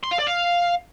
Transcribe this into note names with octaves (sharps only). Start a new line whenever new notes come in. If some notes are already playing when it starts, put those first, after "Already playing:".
C6
F5
D5
F5